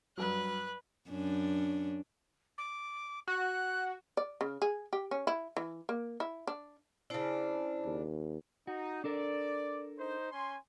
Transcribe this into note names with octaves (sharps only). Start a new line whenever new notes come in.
G2 F#3 B4 F#6
F#2 C#4 D4
D6
F#4 F#6
D5
C#3
G#4
G4
C#4
E4
E3
A#3
E4
D4
C#3 D4 E4 C5 A5
D#2
D#4 F#4
D4 A4 A#4 D5
D#4 C5
C#4 G#5 C6